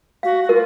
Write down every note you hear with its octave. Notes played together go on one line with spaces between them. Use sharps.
F#4 F5
F#4
F4 A#4